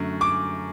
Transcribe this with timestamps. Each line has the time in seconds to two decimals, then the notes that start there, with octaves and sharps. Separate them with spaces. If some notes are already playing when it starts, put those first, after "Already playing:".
Already playing: F#2 D3 A3
0.21 D6